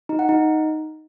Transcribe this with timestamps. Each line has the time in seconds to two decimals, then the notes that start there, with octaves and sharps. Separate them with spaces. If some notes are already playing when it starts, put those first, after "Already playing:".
0.09 D#4
0.19 F#5
0.29 D#4